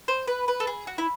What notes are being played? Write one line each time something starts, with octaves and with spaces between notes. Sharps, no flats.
C5
B4
B4
A4
G#4
F#4
E4